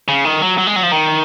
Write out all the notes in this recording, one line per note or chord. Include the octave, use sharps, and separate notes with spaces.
C#3
D#3
F#3
F#3
G#3
F#3
F3
D#3